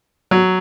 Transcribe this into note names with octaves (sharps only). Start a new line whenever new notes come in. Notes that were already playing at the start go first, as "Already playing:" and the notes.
F#3